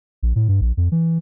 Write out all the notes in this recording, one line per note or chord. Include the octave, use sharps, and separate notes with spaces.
A#1
A2
G2
A#1
F2
E3